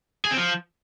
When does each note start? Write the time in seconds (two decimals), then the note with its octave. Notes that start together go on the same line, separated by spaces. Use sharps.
0.25 G#4
0.31 C4
0.37 F3